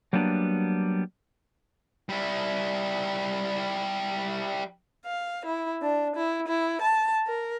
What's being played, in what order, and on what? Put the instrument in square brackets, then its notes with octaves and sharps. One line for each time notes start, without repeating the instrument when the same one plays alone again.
[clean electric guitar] F#3 G3 A#3 B3 D4
[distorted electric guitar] G3 E4
[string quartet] F5
E4
D4
E4
E4
A5
A#4